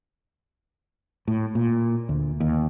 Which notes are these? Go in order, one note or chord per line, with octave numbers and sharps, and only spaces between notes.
A2
A#2
D2
D#2